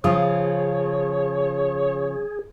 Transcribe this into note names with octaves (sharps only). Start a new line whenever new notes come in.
C#3 F3 F4 G#4 C#5